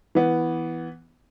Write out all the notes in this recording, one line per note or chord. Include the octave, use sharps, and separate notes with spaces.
E3 B3